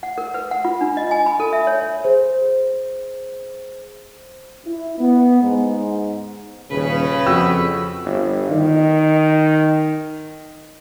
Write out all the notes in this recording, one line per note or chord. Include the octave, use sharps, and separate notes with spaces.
F#5
A#4
B4
F#5
F4
D4
D#5
G#5
B5
A4
E5
C#5
G#4 C5
E4
B3
G#2
D#1 C#3 B4
F2 F#4 G5 E6
G1
D#3